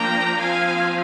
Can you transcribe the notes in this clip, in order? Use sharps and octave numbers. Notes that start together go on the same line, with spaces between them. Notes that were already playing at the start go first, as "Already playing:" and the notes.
Already playing: F3 A#3 D4 G5 A#5
F3 C4 F5 G#5